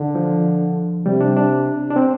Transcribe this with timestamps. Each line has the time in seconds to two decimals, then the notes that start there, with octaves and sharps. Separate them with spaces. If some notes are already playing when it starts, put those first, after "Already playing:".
Already playing: D3
0.15 F3
1.06 C3 G3
1.21 D4
1.36 D4
1.91 D4
1.96 C4